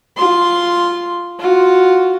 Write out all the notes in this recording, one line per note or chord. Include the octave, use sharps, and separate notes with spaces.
F4 C6
F4 F#4